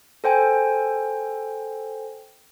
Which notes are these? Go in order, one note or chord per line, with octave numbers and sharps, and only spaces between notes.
A4 C5 G5 G#5